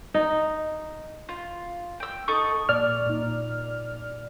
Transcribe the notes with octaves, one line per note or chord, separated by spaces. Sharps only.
D#4
F4
G5 E6
D#4 A4 D#5 C#6
A#2 D5 F6
A#2 D#4